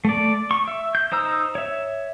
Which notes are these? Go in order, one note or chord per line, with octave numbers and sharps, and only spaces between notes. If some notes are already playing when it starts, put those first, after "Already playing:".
A3 D5
C#6
E5
G6
D#4 C5 A#5 E6
C#5 E5